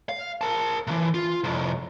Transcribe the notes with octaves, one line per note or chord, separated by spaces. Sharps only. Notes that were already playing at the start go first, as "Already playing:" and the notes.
F5
A#4 A5
C3 E3
F4
C2 F2